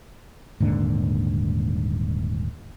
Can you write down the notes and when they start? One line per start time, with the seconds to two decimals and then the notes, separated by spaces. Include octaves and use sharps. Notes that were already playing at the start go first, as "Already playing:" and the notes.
0.60 D#1 G#2 D3 A#3